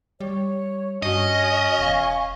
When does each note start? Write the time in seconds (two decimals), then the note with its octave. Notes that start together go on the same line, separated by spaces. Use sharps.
0.20 G3 C#5
1.02 G2 C#4 F#4 D#5
1.79 E1 F5 G#5 C#6